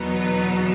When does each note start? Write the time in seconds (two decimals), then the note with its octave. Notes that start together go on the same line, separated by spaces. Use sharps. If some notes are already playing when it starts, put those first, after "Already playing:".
Already playing: E2 B2 F#3 B3 D#4
0.13 B4